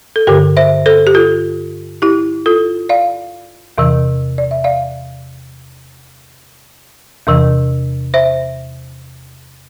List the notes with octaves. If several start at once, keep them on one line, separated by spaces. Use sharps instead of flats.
A4
G2 D3 G4 A#4
C5 E5
A4 C5
G4
F4 A4
E4 G4
F4 A4
D5 F5
E2 C3 E3
D5
E5
D5 F5
E2 C3 E3
C5 E5